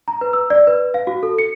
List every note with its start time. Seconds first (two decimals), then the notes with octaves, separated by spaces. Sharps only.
0.08 A#5
0.21 B4
0.33 E6
0.50 D5
0.67 B4
0.94 F5
1.07 F#4
1.23 A4
1.39 C#7